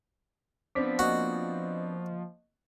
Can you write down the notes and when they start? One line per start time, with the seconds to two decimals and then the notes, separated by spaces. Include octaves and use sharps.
0.75 F3 B3 C4 D4 D6 B6
0.99 A#3 F#4 D#5